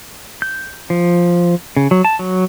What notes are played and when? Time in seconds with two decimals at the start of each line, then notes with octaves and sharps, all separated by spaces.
0.42 G6
0.90 F3
1.76 C#3
1.91 F#3
2.05 A5
2.19 F#3